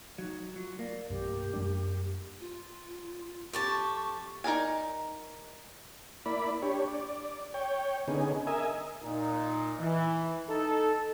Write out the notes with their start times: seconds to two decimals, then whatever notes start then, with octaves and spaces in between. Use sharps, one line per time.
0.18 F#3 D#4
0.56 F#3 F4
0.79 A#3 D5
1.10 B1 G2 G4
1.53 F#2 G3 D4
2.40 F4
3.53 F2 G4 A5 C#6
4.44 D#4 A#4 D5 G#5
6.26 A#3 E4 D5 B5
6.62 D4 G4 C#5
6.88 D5
7.54 C#5 G5
8.08 D3 B3 C#4 D#4 G#4
8.47 A#4 D#5 E5 G#5
9.03 A#2 D#4
9.80 E3
10.49 D#4 A4